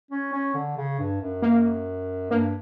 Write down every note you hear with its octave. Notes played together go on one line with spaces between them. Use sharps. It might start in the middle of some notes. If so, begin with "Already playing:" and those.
C#4
C#4
D3
C#3
G2
F#2
A#3
G2 A#3